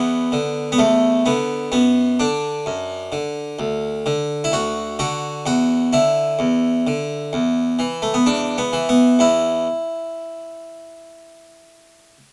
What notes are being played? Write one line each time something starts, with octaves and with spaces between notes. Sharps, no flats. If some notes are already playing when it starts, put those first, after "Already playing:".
Already playing: E2 B3
D3
B3
E2 A3
D3 B3
F#2 B3
D3 D4
F#2
D3
D2
D3
E4
D2 F#4
D3 F#4
E2 F#4
D3 E4
E2
D3
E2
E3
A3
B3
E2 D4
B3
E3
B3
E2 E4